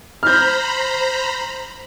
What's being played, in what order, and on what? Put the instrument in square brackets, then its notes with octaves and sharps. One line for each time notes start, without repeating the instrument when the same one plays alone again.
[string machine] C5 A#5 B5 [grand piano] F6 G6